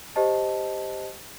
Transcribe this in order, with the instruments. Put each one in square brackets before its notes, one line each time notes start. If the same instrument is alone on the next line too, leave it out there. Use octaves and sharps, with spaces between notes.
[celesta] G4 C5 D#5 A5